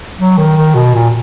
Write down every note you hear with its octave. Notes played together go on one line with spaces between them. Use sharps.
F#3
D#3
D#3
B2
A#2